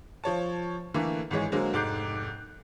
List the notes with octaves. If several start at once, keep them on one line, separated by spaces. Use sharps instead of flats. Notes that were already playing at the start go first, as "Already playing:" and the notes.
F3 C#5 A5
D3 E3 A3 A#3
G#1 E3 G#3 C#5
D3 F#3 G#3 A#3 C5
F1 G#2 D6 F#6 G6 C7